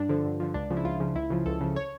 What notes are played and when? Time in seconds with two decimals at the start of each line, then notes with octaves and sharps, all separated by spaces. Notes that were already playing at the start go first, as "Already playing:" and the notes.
Already playing: G2 D4
0.09 D3 F3
0.25 G2
0.40 D3 F3
0.54 C#2 D4
0.70 C#3 F3
0.77 E4
0.85 C#2 F4
1.00 C#3 F3
1.15 C#2 E4
1.30 C#3 F3
1.46 C#2 A4
1.61 C#3 F3
1.76 C#5